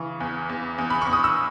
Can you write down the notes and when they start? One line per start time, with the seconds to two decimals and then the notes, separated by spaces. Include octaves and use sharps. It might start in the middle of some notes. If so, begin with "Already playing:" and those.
Already playing: C#3 E3 C#6
0.20 E2
0.49 E2
0.78 E2
0.90 B5
1.02 C#6
1.07 E2
1.13 D#6
1.24 E6